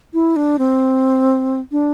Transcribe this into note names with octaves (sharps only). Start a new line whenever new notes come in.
E4
D4
C4
D4